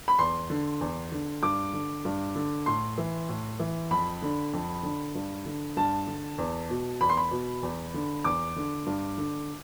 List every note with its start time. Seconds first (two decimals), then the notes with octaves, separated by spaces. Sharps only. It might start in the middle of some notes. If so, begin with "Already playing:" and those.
0.08 B5
0.19 E2 C6
0.50 D3
0.81 E2
1.12 D3
1.43 G2 D6
1.73 D3
2.05 G2
2.35 D3
2.66 A2 C6
2.98 E3
3.29 A2
3.59 E3
3.91 F2 B5
4.22 D3
4.53 F2
4.83 D3
5.15 G2
5.46 D3
5.77 G2 A5
6.07 D3
6.38 E2
6.70 B2
7.01 E2 B5
7.09 C6
7.17 B5
7.31 B2
7.63 E2
7.94 D3
8.24 E2 D6
8.56 D3
8.86 G2
9.18 D3